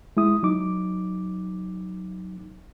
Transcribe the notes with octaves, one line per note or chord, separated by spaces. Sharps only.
G#3 E4 D#6
F#3 D#4 D6